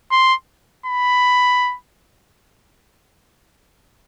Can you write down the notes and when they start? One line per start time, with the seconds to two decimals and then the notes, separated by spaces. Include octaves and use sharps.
0.11 C6
0.86 B5